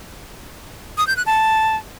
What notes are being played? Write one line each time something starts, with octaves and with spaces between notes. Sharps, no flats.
D#6
G6
F#6
A5